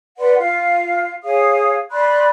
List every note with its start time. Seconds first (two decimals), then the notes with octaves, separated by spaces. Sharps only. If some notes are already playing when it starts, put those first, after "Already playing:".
0.18 B4 D5 F#5 C6
0.38 F4 F5
1.24 G#4 C#5 F5 D#6
1.91 D5 B5 C6 F#6